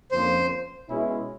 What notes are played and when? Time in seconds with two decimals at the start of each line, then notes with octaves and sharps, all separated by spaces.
0.11 F2 D3 F3 A#3 C#4 C5
0.88 B2 G#3 C#4 E4